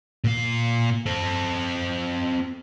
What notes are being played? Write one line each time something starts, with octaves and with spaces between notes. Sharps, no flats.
A#2 F5
C4 A4